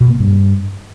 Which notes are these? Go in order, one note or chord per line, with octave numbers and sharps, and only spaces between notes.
B2
A#3
G2